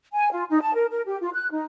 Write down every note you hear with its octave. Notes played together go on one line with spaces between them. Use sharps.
G#5
F4
D#4
A5
A#4
A#4
G4
F4
F#6
D#4